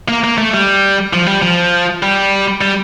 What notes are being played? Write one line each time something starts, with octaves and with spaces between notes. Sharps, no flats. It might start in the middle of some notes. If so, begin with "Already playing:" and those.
A#3
A#3
A3
G3
F3
G3
F3
G3
G3